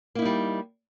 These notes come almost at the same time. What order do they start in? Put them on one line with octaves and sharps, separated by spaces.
A#3 E4 D#4 G3